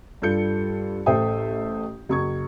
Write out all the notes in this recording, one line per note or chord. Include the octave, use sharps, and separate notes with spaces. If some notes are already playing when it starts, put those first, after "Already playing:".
G2 G3 F4 A4 G6 C#7
A1 A4 C5 E5 G5 D#6
F#1 C#6 G#6